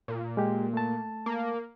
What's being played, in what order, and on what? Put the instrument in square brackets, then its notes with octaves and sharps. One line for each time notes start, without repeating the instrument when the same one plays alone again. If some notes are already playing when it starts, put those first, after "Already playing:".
[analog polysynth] A#2
[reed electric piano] G#3 G4
A3 A5
[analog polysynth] A#3